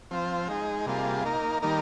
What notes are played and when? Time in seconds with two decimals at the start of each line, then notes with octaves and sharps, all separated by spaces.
0.11 F3 C4 F4 C5
0.48 G#3 D#4 G#4
0.86 C3 G3 A#3 F4 G#4
1.24 A#3 D#4 A#4
1.62 D#3 G3 A#3 D#4 A#4